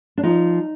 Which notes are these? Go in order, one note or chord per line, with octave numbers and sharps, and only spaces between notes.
D4
F3 D#4